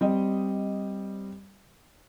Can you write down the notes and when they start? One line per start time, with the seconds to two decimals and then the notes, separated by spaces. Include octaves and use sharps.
0.01 G3 C4 D#5